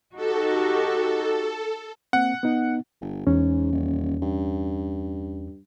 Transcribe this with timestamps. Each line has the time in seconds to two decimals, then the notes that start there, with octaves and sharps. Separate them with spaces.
0.16 D#4 F#4 G4 A4
2.13 A#3 C4 F#5
2.43 B3 D#4
3.01 G1
3.27 E2 G#2 C#4
3.72 D#1
4.22 G2